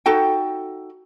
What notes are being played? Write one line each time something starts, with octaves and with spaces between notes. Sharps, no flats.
D#4 F#4 A4 G5